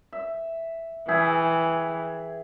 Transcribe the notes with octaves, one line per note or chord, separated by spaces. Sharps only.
E5
E3 G#4 E5 G5